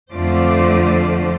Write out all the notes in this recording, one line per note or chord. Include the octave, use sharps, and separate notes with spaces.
F2 D3 A3 F4 C5 D5